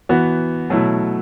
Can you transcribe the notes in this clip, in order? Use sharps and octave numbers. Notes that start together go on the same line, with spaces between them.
E3 B3 F#4
B2 F#3 A3 E4